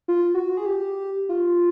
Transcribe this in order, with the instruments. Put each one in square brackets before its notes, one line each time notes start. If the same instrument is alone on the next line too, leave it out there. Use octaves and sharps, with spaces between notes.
[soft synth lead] F4
F#4
G#4
G4
F4